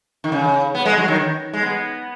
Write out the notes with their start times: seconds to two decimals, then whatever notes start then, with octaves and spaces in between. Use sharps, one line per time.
0.24 D#3
0.32 C#3
0.75 B3
0.85 G#3
0.98 F#3
1.08 D#3
1.53 G#3
1.62 B3